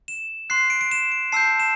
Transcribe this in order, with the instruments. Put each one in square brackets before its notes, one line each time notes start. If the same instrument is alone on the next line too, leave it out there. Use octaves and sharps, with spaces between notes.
[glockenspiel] E7
C6 F#6 C7
D7
D7
E7
D7
A5 E6 G6 C7
E7